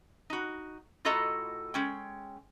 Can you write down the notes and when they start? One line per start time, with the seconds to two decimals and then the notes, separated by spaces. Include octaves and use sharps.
0.30 D#4 F#4
1.05 A2 F4 F#4 A4 D#5 A#5
1.74 G#3 C#4 G5